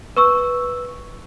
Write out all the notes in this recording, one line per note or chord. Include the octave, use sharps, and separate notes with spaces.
B4 C#6 E6